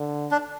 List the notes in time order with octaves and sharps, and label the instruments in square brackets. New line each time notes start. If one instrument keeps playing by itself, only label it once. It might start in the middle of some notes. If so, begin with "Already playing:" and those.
Already playing: [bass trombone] D3
[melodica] D4